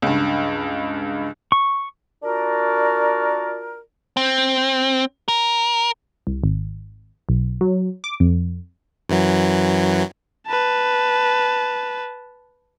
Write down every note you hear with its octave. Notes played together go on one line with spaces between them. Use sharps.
C#2 G2
C#6
D4 F4 F#4 A#4
C4
A#4
C2
G#1
B1
F#3
D6
F2
F#2 E3 F#3
B4 A5